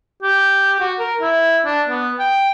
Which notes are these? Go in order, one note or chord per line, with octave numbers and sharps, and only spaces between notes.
G4
F#4
A#4
E4
D4
B3
G5